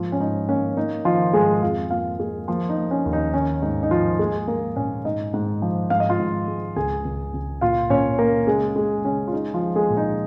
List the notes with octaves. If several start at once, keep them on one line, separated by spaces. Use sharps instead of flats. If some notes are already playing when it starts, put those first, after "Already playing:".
Already playing: G#2 F3 A#3 F4
C#4
G#2 D#4
A#3 C#4
A#3 D#4
D#3 F3 F4
G#2 G#3 G#4
F2 F4 F5
A#3 F4 F5
G#3 A#3 G#4
F3 A#3 F4
D#4
A#3
C#4
D#2
D#4
D#3 C#4
G#2 D#4
D#4
G#2 F3 F4
G#3 A#3 G#4
A#3 A#4
A#2 C#4 C#5
G#2 D#4 D#5
G#2
F3
G#2 F5
D#5
F4 F5
G#2
G#3
C#2 G#4 G#5
C#2
C#2
A#2 F4 F5
A#2 C#4 C#5
A#3 A#4
C#3 G#3 G#4
G#3 G#4
C#3 C#4
F4
G#3 D#4
F3 F4
G#3
G#3 G#4
A#2
D#4